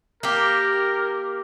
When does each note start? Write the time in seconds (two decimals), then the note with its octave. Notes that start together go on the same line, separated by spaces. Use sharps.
0.23 A#3 G4 A#4